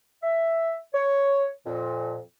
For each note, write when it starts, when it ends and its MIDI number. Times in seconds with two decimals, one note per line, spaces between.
0.23 0.76 76
0.94 1.46 73
1.66 2.20 41
1.66 2.20 46